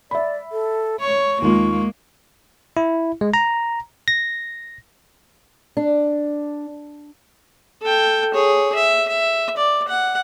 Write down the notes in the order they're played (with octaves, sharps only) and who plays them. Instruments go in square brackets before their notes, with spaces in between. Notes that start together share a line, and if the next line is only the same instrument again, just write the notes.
[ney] D5 [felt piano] E5 B5
[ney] A4
[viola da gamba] C#5 [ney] C#6
[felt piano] D#2 F4 [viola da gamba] G#3 A#3
[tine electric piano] E4
G#3
A#5
A#6
[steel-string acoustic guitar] D4
[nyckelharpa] A4 G5
G#4 C#5
E5
E5
D5
F#5